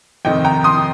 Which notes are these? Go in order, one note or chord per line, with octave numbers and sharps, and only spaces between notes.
F2 C3 D#3 D#5 G5
G5 A#5
C6 D#6